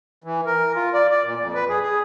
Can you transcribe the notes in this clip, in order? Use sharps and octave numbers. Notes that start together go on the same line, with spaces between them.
E3
A#4
F4
D5
D5
A#2
F2
B4
G#4
G#4